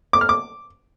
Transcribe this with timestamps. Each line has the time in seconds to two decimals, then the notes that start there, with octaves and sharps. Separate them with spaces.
0.13 D6
0.21 F6
0.29 D6